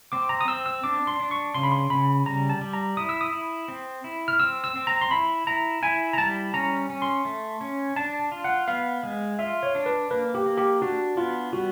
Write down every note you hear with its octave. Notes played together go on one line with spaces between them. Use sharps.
C4 D6
A#5
D#6
C4 E6
E6
D4 D6
C6
D4
C#6
C#3 C6
B5
C6
C#3 B5
G3 A#5
A5
G3
A#5
E4 D#6
E6
D#6
E4
C4
E4
F6
C4 E6
E6
C4
A#5
C6
E4 B5
E4 A#5
E4 G#5
A#5
G3 A5
C#4 A#5
C#4
C6
A3
C#4
D4 A5
F4
F#5
B3 F5
G#3
F4 E5
C#5
D4
B4
A#3 B4
G4
A#3
G4
D4 F#4
B3 F4
G3 F#4